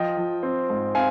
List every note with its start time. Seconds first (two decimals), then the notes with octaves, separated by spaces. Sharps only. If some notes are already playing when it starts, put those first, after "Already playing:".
Already playing: F3 D#5 G5
0.17 F3
0.43 C4
0.70 G#2
0.95 C4 F5 G#5